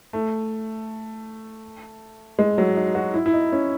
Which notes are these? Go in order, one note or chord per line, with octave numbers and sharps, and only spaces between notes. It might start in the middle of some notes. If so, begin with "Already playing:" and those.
A3
G#3
F#3
D#4
F#4
E4
E4
D#4
C#4